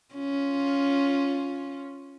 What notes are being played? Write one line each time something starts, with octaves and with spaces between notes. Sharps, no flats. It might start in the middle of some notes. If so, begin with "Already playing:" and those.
C#4 F4